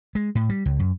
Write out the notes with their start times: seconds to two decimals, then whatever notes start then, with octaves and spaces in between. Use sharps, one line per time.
0.15 G#3
0.35 A2
0.49 G3
0.66 C#2
0.79 F#2